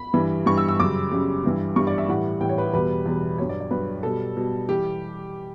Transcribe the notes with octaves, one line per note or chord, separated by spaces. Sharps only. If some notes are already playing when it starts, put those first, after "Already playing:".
Already playing: B5
G2 E3 G3
G2 E3 G3 C#6
E6
E6
F#2 C#3 G3 D6
F#2 C#3 G3
G2 E3 G3
G2 E3 G3 C#6
D5
E5
A2 E3 G3 F#5
A2 E3 G3 G5
C#5
B4
G4
E2 B2 G3 B4
E2 B2 G3
G2 F#3 C#5
D5
D5
G2 F#3 B4
B2 G3 A4
B2 G3
E3 G3 G4